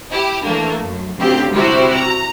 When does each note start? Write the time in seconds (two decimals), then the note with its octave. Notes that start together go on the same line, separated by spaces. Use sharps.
0.11 E4 G4
0.44 E3 A3 A#3 D4
0.81 F#2
1.17 D2 C#3 C4 G4
1.53 C3 G3 E4 F#4 G4 C5
1.94 A#5